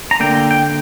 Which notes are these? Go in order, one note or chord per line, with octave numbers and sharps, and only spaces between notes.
A#5
D3 A#3 G5
G5
G5